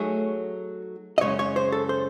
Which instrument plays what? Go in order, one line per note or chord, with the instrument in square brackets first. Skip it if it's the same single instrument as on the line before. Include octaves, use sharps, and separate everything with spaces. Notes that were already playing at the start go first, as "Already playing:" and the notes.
Already playing: [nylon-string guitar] F#3 A3 D#4 G#4 [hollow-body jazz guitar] C#5
[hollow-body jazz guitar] D#5
[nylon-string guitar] F#2 C#3 G#3 [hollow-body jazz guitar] C#5
[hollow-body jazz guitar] C#5
C5
A4
C5